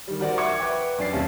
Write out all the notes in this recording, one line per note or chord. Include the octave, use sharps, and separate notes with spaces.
D#3 G3
F#4 A#4 C5 D5 F#5
E5 F#5 C#6 D6 G#6 C#7
B4 E5 G5 D6
F#2 C#4 D4 D5 A6 C7
D#2 C3 C#4 A5